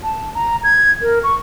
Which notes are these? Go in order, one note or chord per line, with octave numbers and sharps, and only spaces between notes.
A5
A#5
G#6
A#4
C#6